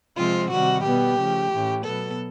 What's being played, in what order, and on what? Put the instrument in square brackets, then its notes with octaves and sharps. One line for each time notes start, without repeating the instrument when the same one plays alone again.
[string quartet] C3 F3 G#3 C4 F4
C3 D#3 G3 F#4
B2 G3 B3 G4
C#3 F3 A3
A2 E3 A3 C#4
B2 F#3 B3 A4